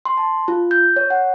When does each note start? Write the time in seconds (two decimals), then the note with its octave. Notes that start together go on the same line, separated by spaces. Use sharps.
0.05 C6
0.17 A5
0.48 F4
0.71 G6
0.96 C#5
1.10 F#5